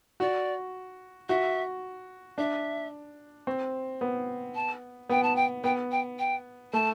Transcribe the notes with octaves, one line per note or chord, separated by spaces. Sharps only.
F#4 D5
F#4 E5
D4 E5
C4
B3
A5
B3 G5
A5
G5
B3 G5
G5
G5
A3 A5